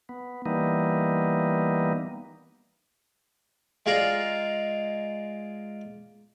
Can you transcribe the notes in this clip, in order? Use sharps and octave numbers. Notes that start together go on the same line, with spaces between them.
B3
E3 G3 A#3 B3 D#4
G#3 F4 D5 A#5